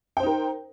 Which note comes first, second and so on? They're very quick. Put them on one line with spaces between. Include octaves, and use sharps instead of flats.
G5 C5 D#4 A#4